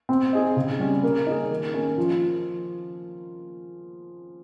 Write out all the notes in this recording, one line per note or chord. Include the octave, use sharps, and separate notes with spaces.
C4
D#4 G#4 D#5
C#3
G3 C#4
A#3
D#4 G#4
D#3
A#3 C#4
F3